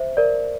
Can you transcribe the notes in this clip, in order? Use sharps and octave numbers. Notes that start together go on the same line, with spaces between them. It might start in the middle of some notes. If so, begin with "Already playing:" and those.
Already playing: C5 E5
A#4 D5